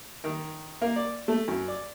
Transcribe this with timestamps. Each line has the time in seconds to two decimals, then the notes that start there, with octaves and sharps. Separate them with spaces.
0.24 D#3
0.81 A#3
0.96 D5
1.28 A3
1.48 F#2
1.68 D5